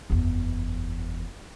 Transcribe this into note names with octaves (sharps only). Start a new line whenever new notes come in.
F#1 E2